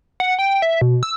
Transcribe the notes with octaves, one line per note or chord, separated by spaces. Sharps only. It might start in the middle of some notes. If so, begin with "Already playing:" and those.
F#5
G5
E5
B2
E6